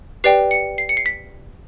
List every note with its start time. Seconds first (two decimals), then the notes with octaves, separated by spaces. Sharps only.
0.24 G4 B4 D5 G5 C7
0.51 C#7
0.78 C7
0.89 C#7
0.97 C7
1.06 B6